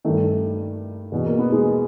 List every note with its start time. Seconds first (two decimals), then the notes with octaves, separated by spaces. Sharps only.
0.04 G2 D#3 A3
1.12 E2 B2
1.26 A#3
1.39 B3
1.52 G#3